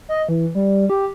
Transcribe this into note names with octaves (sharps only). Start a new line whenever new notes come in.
D#5
E3
G3
G4